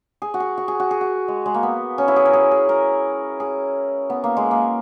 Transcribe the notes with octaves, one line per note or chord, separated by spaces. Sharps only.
G#4
F#4
G#4
F#4
G#4
F#4
G#4
F#4
G#3
G#3
A#3
B3
C#4
E4
G#4
A#4
G#4
G#4
A#4
G#4
B3
A#3
G#3
A#3